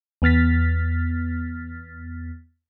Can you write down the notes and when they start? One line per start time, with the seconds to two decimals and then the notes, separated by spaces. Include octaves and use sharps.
0.22 E2 B3 F6 A6 B6